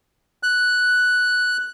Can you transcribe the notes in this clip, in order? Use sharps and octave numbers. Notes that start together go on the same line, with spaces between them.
F#6